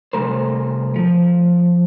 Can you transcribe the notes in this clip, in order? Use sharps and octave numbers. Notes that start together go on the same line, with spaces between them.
C2 A3 A#4 C5
F3